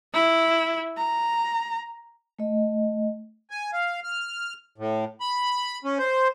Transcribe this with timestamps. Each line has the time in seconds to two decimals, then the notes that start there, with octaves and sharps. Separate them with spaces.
0.14 E4
0.97 A#5
2.39 A3 D#5
3.50 G#5
3.73 F5
4.04 F6
4.78 A2
5.21 B5
5.84 C#4
5.98 C5